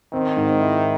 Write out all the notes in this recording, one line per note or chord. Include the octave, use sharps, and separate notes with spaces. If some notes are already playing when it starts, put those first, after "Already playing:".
D#3 C4
G#2
E4